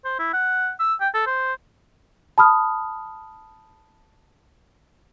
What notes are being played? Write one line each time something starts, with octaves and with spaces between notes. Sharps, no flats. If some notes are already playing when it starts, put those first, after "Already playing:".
C5
E4
F#5
E6
G5
A4
C5
A5 B5 D#6 F6